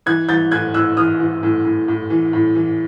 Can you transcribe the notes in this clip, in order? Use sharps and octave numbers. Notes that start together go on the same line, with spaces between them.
E3 F#6 G#6
E3 G6 A6
A2 F#6 G#6
A2 E6 F#6
E3 D#6 F6
E3
A2
A2
A2
E3
A2
E3